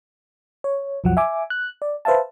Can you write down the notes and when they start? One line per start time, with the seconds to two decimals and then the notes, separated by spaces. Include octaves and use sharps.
0.64 C#5
1.04 B1 F2 F3 F#3 F#5
1.17 E5 G#5 D6
1.50 F#6
1.82 D5
2.05 B4 C5 E5 F5 A5